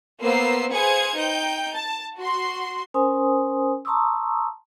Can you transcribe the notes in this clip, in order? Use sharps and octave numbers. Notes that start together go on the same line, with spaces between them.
A#3 B3 C5 E6 C7
G#4 B4 C5 F5 G#6 C#7
D#4 G5 G6
A5
F#4 C6
C#4 A#4 C5 G#5 C6 D#6
A5 A#5 C6 C#6 D#6 E6